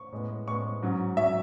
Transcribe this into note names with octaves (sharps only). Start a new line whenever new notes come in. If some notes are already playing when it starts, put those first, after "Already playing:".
Already playing: C#6
A2 G#3 B3
A2 G#3 B3 C#6
G#2 F#3 C#4
F#3 C#4 E5